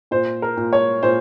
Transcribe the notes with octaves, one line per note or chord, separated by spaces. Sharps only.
A#2 C5
A#4
A#2
C#5
A#2 C5